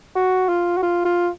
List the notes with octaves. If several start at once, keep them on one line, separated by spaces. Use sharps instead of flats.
F#4
F4
F#4
F4
F4